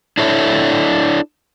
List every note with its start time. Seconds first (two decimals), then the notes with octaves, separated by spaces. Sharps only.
0.18 D4 E4 A4 C#5 E5